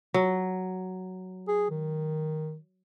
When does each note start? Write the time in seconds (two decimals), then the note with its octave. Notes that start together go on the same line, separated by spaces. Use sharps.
0.14 F#3
1.48 G#4
1.70 D#3